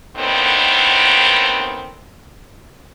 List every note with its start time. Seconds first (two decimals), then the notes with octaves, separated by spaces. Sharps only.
0.17 D#2 A2 D3 D#3 B3 C4